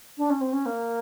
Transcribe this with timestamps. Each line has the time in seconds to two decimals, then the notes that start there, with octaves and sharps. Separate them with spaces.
0.18 D4
0.30 C#4
0.41 C4
0.53 C#4
0.66 A#3